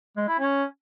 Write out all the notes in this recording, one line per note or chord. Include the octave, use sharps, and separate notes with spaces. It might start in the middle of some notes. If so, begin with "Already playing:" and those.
G#3
E4
C#4